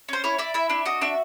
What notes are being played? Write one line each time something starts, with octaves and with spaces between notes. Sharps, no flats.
C#4 C5
E4 C#5
E4 D5
E4 E5
D4 E5
F#4 D#5
D4 E5